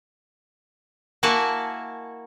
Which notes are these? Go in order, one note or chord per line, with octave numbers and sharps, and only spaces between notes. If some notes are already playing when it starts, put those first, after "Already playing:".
A#3 E4 F#4 A#4 G#5 A5